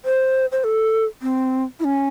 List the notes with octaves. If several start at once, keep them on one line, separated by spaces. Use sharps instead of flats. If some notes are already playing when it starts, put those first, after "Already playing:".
C5
C5
A4
C4
E4
C#4